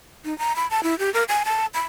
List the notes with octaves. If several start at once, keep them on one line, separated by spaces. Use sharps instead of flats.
D#4
A#5
B5
A5
E4
G4
A#4
G#5
A5
B5